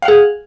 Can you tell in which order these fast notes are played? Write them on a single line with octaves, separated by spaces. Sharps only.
F5 F#5 G#4